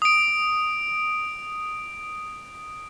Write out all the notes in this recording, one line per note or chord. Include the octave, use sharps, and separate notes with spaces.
D#6 D7